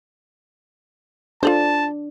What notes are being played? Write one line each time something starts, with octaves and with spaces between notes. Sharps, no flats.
D4 F4 A4 C5 A5